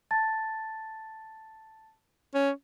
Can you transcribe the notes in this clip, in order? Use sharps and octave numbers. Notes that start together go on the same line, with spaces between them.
A5 A6
C#4